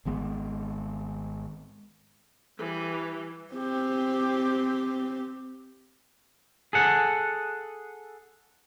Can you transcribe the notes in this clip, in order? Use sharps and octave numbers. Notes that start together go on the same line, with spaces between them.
G#1 D#3 G#3 B3
E3 G3
C4 G4
G#4 A4 F#5